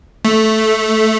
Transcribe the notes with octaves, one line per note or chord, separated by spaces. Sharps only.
A3